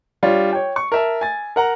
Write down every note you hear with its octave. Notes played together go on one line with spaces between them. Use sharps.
G3 D4 F4 C#5
C#5 G5
C#6
A#4 E5 A5
G#5 A6
A#4 F#5 A#5